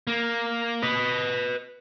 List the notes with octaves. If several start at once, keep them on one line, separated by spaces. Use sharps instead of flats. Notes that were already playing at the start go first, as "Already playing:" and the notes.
A#3
B4 D#5